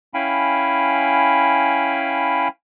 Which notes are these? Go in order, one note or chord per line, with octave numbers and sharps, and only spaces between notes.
C#4 E4 F5 G5 G#5 B5